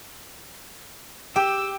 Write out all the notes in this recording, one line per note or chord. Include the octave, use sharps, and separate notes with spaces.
G4 G5 E6